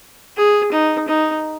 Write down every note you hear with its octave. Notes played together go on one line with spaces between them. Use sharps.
G#4
D#4
D#4